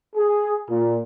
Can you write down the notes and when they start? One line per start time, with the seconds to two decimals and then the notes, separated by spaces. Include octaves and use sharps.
0.16 G#4
0.69 A#2